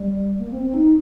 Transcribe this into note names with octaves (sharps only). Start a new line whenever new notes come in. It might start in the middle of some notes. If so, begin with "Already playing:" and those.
Already playing: G3
A#3
C4
C4
D#4